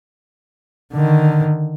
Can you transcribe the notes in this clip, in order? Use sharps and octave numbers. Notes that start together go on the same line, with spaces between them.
D3 D#3